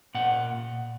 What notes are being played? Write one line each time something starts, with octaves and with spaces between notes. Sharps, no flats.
A#2 F#5